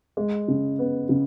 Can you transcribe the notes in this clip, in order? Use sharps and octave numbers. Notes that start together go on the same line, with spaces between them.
G#3
C#3
B3
C#3